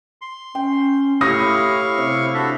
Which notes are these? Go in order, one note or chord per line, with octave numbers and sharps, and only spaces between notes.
C6
C#4 G5
A2 E4 G4 F5 B5 C#6 D#6 A#6
C3
D4 F#4 A4 E5